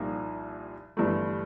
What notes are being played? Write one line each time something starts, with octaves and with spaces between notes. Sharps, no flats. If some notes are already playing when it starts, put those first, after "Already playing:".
Already playing: C2 A#2 F3 A#3 D#4
G1 G2 E3 A3